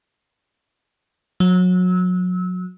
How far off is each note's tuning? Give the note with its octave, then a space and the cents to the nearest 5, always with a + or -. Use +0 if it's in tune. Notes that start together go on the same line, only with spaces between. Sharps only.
F#3 -30 E6 -30